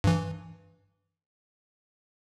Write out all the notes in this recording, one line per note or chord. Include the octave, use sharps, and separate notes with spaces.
G2 E3